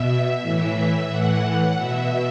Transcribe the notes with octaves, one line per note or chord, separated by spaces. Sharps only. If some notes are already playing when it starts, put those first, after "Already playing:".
Already playing: B2 E5
A2 E3
A2 E3 F#5
B2 E5